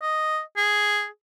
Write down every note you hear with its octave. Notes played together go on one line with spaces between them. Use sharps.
D#5
G#4